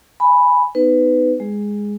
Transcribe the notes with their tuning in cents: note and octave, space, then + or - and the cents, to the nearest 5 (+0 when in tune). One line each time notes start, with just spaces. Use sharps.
G#5 +0 B5 +0
B3 +30 D#4 +5 B4 +25
G#3 -15 G#4 +0